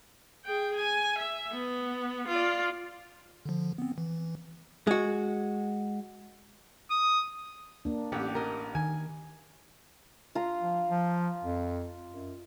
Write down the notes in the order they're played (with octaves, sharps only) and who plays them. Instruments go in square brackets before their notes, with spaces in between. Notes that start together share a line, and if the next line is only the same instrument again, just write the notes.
[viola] G#4 G5
G#5
E5
B3
F4 D5
[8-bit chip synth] D3 F3
B3 C4
E3
[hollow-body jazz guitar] G#3 F#4
[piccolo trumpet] D#6
[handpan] A#3 D4
[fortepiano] A1 [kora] G4 F#5
[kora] A#4 D#5
[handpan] D#3 [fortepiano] G#5
[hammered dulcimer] F4 A#5
[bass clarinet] F3
F3
F2
F#2